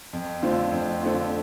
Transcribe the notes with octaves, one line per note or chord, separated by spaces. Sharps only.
F2
D3 A3 C4 F4
F2
D3 A3 C4 F4